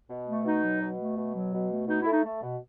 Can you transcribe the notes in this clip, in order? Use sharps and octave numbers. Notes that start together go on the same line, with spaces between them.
B2
A3
B2 D#4
F#3
B2
A3
B2
F#3
B2
A3
B2 D#4
A3 E4
D#4
A3
B2